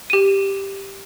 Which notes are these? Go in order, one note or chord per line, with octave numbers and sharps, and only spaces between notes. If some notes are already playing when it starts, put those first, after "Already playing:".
G4 D#7